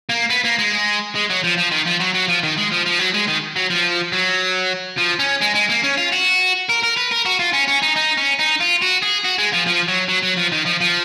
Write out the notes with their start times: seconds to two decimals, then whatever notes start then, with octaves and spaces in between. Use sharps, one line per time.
0.09 A#3
0.30 B3
0.44 A#3
0.58 G#3
1.15 G#3
1.30 F#3
1.44 F3
1.58 F3
1.71 D#3
1.86 F3
2.00 F#3
2.14 F#3
2.28 F3
2.43 D#3
2.57 G#3
2.72 F3
2.86 F3
2.99 F#3
3.14 G#3
3.27 D#3
3.56 F#3
3.70 F3
4.13 F#3
4.98 F3
5.19 C#4
5.41 G#3
5.55 G#3
5.69 A#3
5.83 C#4
5.98 F4
6.12 F#4
6.69 A#4
6.83 A#4
6.97 B4
7.11 A#4
7.25 F#4
7.39 F4
7.53 C#4
7.68 C#4
7.82 D#4
7.96 D#4
8.17 C#4
8.39 D#4
8.60 F4
8.82 F#4
9.02 G#4
9.24 F#4
9.38 G#3
9.53 F3
9.66 F3
9.88 F#3
10.09 F#3
10.23 F#3
10.37 F3
10.52 D#3
10.66 F3
10.81 F3